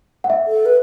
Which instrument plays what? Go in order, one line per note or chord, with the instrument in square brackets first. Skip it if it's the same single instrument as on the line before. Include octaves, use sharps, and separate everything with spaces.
[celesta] F#5
E5
[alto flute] A4
B4